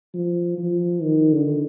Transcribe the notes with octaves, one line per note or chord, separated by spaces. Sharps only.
F3
F3
D#3
D3